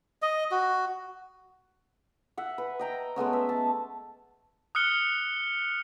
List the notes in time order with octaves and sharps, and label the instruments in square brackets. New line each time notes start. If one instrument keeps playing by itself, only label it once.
[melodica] D#5
F#4
[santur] E5 F#5
B4
D#5 G5 A#5
G#3 A3 B3 C#4
E5
A5
[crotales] D#6 F6 F#6 C#7 G7